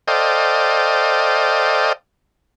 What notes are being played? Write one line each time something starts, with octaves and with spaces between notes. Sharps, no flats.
A4 C5 D5 D#5 F5 G5